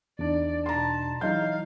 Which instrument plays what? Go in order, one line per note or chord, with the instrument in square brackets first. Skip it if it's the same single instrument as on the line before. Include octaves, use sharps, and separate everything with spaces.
[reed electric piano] E2 D4 D#4 [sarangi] D5
[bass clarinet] B2 [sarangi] A5 [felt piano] A#5 C6
[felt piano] E3 D#4 G6 [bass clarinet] F#3 [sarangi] F5